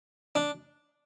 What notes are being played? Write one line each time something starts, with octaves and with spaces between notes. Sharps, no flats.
D4